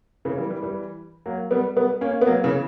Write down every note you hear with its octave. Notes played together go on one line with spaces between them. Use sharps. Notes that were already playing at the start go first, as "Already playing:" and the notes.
C#3 E3
E3 G3
E3 G3
E3 G3
F#3 A#3
G3 B3
G3 B3
A#3 C#4
B3
F#3 A#3
C#3 E3